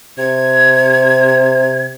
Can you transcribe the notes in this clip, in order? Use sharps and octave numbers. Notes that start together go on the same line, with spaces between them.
C3 G#6